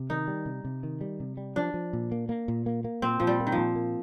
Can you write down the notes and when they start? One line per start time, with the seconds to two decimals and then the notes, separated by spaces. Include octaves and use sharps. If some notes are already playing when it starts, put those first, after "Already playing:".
Already playing: C3
0.10 D#3 D#4
0.27 G3
0.46 C3
0.65 C3
0.83 D#3
1.01 G3
1.20 C3
1.37 G3
1.56 F3 D4
1.74 F3
1.93 A#2
2.12 A#3
2.29 A#3
2.48 A#2
2.66 A#3
2.84 A#3
3.02 A#2 C4
3.20 A#2 F3
3.27 G3
3.40 A#3
3.47 D#3
3.52 F3
3.58 A#2
3.76 A#3